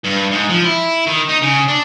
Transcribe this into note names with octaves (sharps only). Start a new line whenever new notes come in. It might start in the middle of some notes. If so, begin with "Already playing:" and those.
G2
G#2
F3
E4
D#3
D#4
C#3
D4